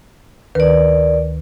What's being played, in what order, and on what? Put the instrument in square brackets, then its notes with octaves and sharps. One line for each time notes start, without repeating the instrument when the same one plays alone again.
[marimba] D2 D#3 B4 [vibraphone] A#4 D5